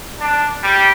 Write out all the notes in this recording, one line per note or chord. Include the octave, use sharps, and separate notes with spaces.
D4
G3